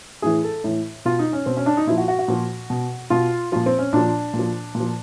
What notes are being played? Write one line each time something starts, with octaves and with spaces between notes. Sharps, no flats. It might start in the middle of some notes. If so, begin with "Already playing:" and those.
A2 E3 G#4
A4
A2 E3
B2 F4
D#4
C#4
B2 C4
C#4
D4
D#4
A#2 F3 E4
F#4
F#4
F#4
A#2 F3
B2
B2 F4
A#2 F3 F4
C4
C#4
A#2 F3 D4
A#2
F3
A#2
F3